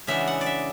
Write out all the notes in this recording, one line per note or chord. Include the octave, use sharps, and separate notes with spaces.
C#3 E3 G#3 B3 D4 E5
F#5
D5
E5